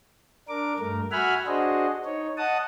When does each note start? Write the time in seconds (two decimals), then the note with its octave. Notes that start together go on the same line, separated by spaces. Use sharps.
0.48 D4 A#4 D6
0.79 G2 A3 A#4
1.12 F#4 E5 F#5 G#5 B5 F6
1.47 D4 F#4 G#4 C5 D#5
2.05 D#4 C#5
2.38 D#5 F#5 A5 D#6